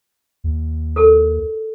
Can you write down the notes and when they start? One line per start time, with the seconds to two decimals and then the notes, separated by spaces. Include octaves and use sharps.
0.44 D#2
0.96 A4 A#4